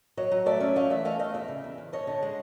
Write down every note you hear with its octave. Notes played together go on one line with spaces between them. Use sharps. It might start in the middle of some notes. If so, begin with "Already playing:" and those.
F#3 C#5 D#5
F#3
A3 D5 E5
C#4
A3 D#5 F5
E3 D5 E5
A3 D#5 F5
A3 D#5 F5
E2 D5 E5
C#3
E2
E2
D3 C#5 D#5
D3
G#3